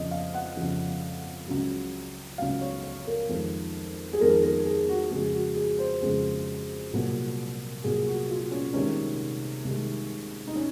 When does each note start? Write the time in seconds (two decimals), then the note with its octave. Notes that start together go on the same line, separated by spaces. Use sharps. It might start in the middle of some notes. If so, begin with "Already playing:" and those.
Already playing: F2 C#3 F3 D#5
0.11 F5
0.34 F#5
0.57 F2 C#3 F3
1.48 C#2 C#3 F#3
2.38 C#2 C#3 F#3 F5
2.61 C#5
2.84 C#5
3.07 A#4
3.29 F2 D#3 G#3
4.13 G#4
4.20 F2 D#3 G#3 A#4
4.43 A#4
4.66 G#4
4.89 F#4
5.11 F2 C#3 G#3 G#4
5.33 F#4
5.56 G#4
5.79 C5
6.02 F2 C#3 G#3 G#4
6.93 C2 A#2 F#3
7.84 C2 A#2 F#3 G#4
8.07 F#4
8.29 F4
8.51 C#4
8.74 C2 C3 D#3 G#3 C#4
9.64 C2 C3 D#3 G#3
10.48 D#4
10.56 C#4